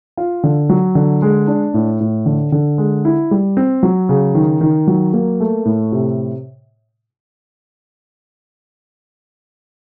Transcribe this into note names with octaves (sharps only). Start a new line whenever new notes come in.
F4
D3
F#3
D3
G#3
D4
A2
A2
D3
D3
G#3
E4
G3
C4
F#3
C#3
D#3
D#3
F#3
A#3
A3
A2
C3